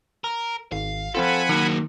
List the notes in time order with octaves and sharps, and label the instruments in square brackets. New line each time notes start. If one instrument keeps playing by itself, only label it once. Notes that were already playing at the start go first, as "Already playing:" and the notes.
[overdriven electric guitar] A#4
[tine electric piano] G#1 [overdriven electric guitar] F5
[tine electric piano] F3 C4 F4 [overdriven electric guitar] A4 [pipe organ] F#5 G#5 B5
[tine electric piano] D#3 [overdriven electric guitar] F#3 A#3